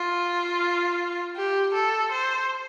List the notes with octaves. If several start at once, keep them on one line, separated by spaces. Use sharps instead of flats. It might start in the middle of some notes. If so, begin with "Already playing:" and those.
Already playing: F4
G4
A4
C5